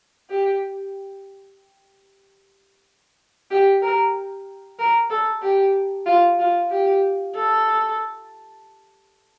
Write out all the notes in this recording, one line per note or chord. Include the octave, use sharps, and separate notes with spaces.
G4
G4
A#4
A#4
A4
G4
F4
F4
G4
A4